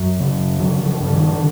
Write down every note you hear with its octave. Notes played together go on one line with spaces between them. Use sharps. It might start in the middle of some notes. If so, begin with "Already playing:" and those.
Already playing: F#2 F#3
C#3
D3 F#3
F3
G2
D#3
D3